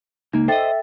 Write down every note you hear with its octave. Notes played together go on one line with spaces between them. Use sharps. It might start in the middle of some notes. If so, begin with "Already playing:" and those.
C#2 A#3 D#4
A4 C5 D#5 E5 G5 A6